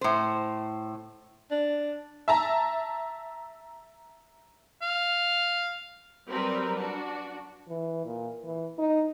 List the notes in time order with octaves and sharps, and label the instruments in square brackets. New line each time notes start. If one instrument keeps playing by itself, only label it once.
[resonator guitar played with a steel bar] A2 C5
[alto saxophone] D4
[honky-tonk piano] E5 A5 A#5
[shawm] F5
[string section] F#3 G3 C4 A#4 B4
D4 F#4
[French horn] E3
A#2
E3
D#4